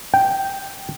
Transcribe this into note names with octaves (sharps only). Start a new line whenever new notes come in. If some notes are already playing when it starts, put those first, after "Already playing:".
G5